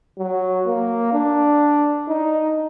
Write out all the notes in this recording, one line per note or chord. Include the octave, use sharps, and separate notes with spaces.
F#3
A#3
D4
D#4